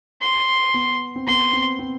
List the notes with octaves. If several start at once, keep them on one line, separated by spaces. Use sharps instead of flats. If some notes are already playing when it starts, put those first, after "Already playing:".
C6
B3
C4
B3 C6
C4
C4